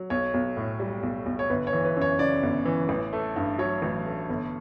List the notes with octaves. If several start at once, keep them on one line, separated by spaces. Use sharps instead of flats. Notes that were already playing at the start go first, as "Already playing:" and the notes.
Already playing: F#3
B1 C#5
B1
A2
G3
B1
B1
C#5
G1 B4
C#5
E3
B4
F#2
C#5
C#3 D5
G1
E3
A1
A3
G2
F#3 C#5
A1
A3
G1